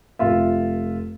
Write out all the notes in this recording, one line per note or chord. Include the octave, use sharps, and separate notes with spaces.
F1 F4 E5